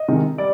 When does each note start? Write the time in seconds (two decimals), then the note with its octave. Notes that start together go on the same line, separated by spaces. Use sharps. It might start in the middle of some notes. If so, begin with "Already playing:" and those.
Already playing: D#5
0.08 C3 D#3 G#3
0.38 G3 D5